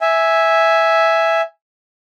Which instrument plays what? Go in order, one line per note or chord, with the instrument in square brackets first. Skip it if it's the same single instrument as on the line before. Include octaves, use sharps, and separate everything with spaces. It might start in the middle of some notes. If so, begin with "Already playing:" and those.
[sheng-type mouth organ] E5 G#5